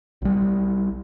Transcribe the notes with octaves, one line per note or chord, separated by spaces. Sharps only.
B1 G3